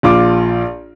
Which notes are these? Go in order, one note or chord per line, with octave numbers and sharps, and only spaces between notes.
A#1 F4 D6